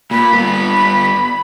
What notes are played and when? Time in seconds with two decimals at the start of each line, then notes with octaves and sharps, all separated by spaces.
0.11 A#2 B5
0.33 G2 B3